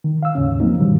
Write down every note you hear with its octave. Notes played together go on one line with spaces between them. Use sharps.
D#3
F5 E6
D#2 G#2 C#3 C#4
F3 F#3 A#3 C4 D#4
G#2 B2 D#3 E3 F#3 G3